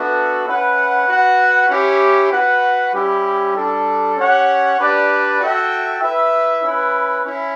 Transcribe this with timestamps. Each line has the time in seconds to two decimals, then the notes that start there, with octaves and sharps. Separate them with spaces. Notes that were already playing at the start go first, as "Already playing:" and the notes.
Already playing: B3 D4 F#4 A4 E5
0.47 C#4 E4 B4 F#5
1.08 F#4 B4 F#5
1.70 C#4 E4 G4
2.31 F#4 B4 F#5
2.93 G3 C#4 E4 G4
3.54 G3 D4 A4
4.17 C#4 G4 C#5 F#5
4.78 D4 G4 B4 D5
5.40 F#4 A4 E5 G5
6.01 E4 B4 E5
6.63 C#4 E4 B4
7.25 C#4 E4